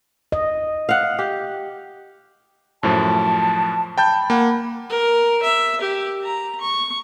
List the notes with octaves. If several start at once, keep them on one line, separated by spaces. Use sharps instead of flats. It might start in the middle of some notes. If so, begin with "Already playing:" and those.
D#5
F5 F#5
G4
F#2 A2 F3 A5
G5 A5 B5 G6
A#3 F#5
A#4
E5
G4
A#5
C#6